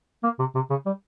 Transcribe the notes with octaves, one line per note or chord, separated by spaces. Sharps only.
A#3
C3
C3
C#3
G3